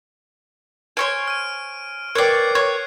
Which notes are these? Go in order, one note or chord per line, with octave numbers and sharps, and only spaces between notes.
C5 C#5 G#5 F6 D7
F6 D#7
A#4 B4 C#5 D5 G5 F#6 G#6 C7
C#5